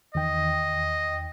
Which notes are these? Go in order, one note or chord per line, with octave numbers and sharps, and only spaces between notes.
E2 D#3 D#5 G5